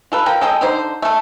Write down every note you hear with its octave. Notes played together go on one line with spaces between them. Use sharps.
F4 A4 B4
F3 A#4 G5
G#3 A4 D#5 G5
D3 D#4 C5
A3 A4